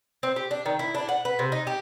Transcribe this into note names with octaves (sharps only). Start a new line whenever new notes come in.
C4
G4
D4
D#3
E4
D4
F#5
B4
C3
D#4
G4